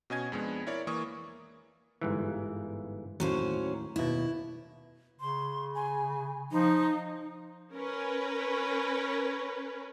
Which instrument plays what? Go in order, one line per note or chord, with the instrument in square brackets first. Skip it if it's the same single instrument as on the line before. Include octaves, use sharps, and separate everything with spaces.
[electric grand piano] B2 C#4 D#5 G#5 G#6
F2 G#3 B3 D4
E4 A#4 C#5 D5
E3 A#3 C#6 D#6
[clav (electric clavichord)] G1 G#2 E3
[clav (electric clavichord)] D#2 A2 [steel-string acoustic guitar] F#3 C#4 C5
[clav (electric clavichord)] D#2 B2 [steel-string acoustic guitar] E4
[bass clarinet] C#3 [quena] C6
[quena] G#5
[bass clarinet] F3 [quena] D#4
[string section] C#4 A#4 B4